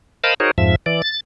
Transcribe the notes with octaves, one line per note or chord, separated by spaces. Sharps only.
A#4 C5 D#5 F5 A5 B5
D#4 F#4 G#4 A#4 C5 C#5
F2 G#2 F3 E5
E3 D5
A6